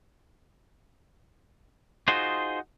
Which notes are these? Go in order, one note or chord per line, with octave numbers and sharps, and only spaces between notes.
D#4 F4 F#4 G#4 C5